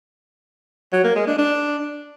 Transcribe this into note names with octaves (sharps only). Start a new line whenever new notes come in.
F#3
A#3
G#3
D4
D4